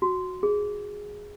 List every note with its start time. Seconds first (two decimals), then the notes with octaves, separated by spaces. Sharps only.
0.02 F#4
0.43 G#4